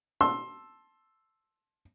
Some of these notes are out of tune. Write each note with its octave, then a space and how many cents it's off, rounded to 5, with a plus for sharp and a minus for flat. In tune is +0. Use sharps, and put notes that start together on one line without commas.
A5 +0 C6 +15 E6 +0